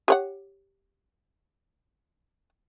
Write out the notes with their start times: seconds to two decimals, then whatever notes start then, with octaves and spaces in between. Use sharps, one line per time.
0.08 G4 C#5 F#5